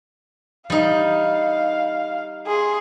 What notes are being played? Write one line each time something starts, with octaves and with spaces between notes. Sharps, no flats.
G3 D#4 F5
G#4 C6